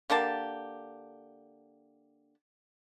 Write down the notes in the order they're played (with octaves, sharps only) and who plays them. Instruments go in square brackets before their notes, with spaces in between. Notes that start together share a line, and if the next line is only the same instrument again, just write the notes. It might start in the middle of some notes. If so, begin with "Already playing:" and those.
[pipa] D3 A#3 G4 A5